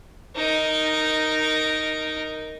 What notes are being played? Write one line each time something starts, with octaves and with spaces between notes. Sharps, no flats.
D#4 A#4